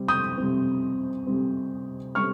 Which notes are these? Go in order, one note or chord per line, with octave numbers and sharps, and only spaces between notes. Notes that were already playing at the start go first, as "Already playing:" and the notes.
Already playing: C3 G3 C4
D#6 G6
C3 G3 C4
C3 G3 C4
G3 C4 C#6 F6